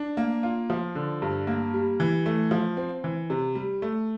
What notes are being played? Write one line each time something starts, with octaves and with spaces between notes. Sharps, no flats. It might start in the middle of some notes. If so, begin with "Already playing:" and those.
Already playing: D4
A#3
F4
F3
D3
G2
A#3
G3
E3
A3
F3
C4
E3
C3
G3
A3